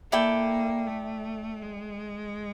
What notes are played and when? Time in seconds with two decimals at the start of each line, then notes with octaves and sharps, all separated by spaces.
0.12 A#3 E4 A4 D5 G5
0.87 A3
1.62 G#3